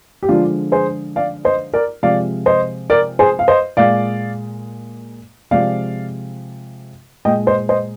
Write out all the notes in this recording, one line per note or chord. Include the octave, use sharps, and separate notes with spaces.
G4
D3 F3 G#3 D4 F4
G#4 C5
D5 F5
C5 D#5
A#4 D5
C3 F3 G#3 D5 F5
C5 D#5
A#4 D5
G#4 C5
F5
C5 D#5
A#2 G#3 D5 F5
C3 F3 G#3 D5 F5
A#2 G#3 D#5 G5
C5 D#5
C5 D#5